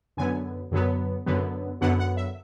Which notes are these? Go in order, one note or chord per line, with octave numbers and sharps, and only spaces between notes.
F#2 D3 F#3 B3 G#5
F#2 D3 F#3 B3
F#2 D3 F#3 B3
F#2 D3 F#3 B3 F#5
F#5
E5